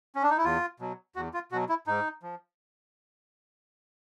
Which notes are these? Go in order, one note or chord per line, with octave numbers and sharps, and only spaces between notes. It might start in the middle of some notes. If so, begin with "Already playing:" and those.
C#4
D4
D#4
E4
E2 F4
B2 F#3
E2 F#4
F4
B2 F#3 F#4
E4
G#2 D#4
F3